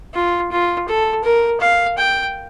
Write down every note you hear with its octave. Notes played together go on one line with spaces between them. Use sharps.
F4
F4
A4
A#4
F5
G5